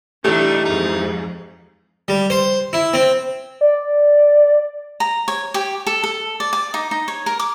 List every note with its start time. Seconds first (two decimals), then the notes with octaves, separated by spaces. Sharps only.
0.25 E3 G3 A3 D4 D#4 G4
0.65 F2 G#2 D#4
2.08 G3
2.30 C5
2.73 E4
2.93 C4
3.61 D5
5.00 A#5
5.28 C#5
5.54 G4
5.87 A4
6.04 A4
6.40 D5
6.53 D5
6.74 D#4
6.91 D#4
7.08 C#5
7.26 A#4
7.39 D6